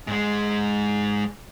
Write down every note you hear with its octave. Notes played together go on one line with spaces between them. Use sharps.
G#2 G#3